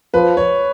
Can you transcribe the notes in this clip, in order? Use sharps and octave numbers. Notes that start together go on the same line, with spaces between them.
F3 B4
C#5